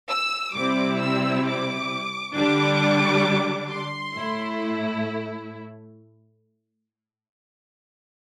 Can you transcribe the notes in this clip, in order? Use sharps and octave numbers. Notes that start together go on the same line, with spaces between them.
E6
C3 G3 C4 E4 D6
E6
D6
D3 G3 D4 D6
C6
A2 A3 E4